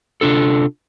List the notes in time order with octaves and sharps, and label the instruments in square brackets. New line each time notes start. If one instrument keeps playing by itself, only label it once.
[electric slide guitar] C3 D4 F4 A4